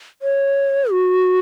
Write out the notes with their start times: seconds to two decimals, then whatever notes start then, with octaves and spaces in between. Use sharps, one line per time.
0.22 C#5
0.91 F#4